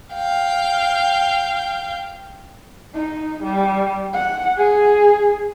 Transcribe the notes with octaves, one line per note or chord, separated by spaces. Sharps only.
F5 G5
D#4
G3
F#5
G#4